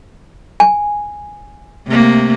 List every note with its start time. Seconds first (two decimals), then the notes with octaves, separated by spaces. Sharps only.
0.60 G#5
1.87 C3 A3 A#3